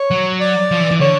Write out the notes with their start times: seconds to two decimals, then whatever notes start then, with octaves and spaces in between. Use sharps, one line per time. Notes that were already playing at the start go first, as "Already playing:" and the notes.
Already playing: C#5
0.11 F#3
0.40 D5
0.71 F3
0.80 E3
0.91 E3
1.00 D3 C#5